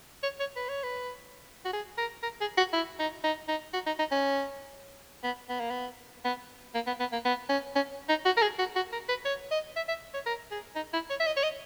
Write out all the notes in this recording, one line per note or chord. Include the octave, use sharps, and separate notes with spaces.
C#5
C#5
B4
C#5
B4
F#4
G#4
A#4
A#4
G#4
F#4
E4
D#4
D#4
D#4
F#4
D#4
D#4
C#4
B3
B3
A#3
B3
B3
A#3
B3
B3
A#3
B3
C#4
C#4
D#4
F#4
A#4
G#4
F#4
F#4
A#4
B4
C#5
D#5
E5
E5
C#5
A#4
G#4
D#4
E4
C#5
E5
D#5
C#5
D#5